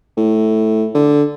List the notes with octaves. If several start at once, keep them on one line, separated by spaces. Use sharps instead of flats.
A2
D3